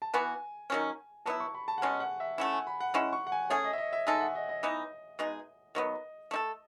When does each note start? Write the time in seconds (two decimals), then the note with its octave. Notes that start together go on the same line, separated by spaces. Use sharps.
0.02 A5
0.14 E3 B3 F#4 G#5
0.70 D#3 F#3 C#4
1.26 F#3 B3 E4 A5
1.40 C#6
1.55 B5
1.68 A5
1.78 F#5
1.81 B2 G#3 C#4 G#5
2.00 F#5
2.20 E5
2.38 A3 C#4 E4 F#5
2.53 G#5
2.67 B5
2.81 F#5
2.94 G#3 C#4 E4 F#5
3.13 C#6
3.27 F#5
3.32 G#5
3.50 A3 C#4 G#4 C#5
3.64 D#5
3.73 E5
3.78 D#5
3.93 E5
4.07 G#3 D#4 A4 G#5
4.15 E5
4.21 F#5
4.35 D#5
4.49 D#5
4.63 E3 B3 D#4
5.19 B2 G#3 D#4 G#4
5.75 D#3 F#3 B3 D#5
6.31 A3 D#4 A4